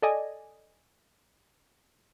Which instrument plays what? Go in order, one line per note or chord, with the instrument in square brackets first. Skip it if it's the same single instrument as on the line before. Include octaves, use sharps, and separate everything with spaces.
[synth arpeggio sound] A4 D5 D#5 G#5